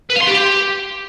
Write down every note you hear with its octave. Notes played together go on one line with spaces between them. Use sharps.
B4
F5
C6
G4